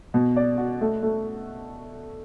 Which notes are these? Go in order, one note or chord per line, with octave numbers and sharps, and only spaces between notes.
B2
D5
F#4
A3
A3